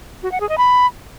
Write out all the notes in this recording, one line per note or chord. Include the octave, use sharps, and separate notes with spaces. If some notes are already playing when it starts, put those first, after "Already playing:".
F#4
F#5
G#4
D#5
B5